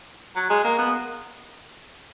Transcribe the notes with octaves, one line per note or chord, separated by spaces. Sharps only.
F#3
G#3
A#3
B3